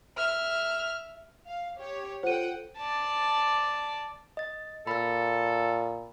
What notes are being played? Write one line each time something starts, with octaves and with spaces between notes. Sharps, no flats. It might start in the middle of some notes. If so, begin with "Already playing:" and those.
E5 F6
F5
G4 C#5
F4 A4 C5 F#5 G5 D#7
D5 A5
D#5 A6
A#2 A4 B5 E6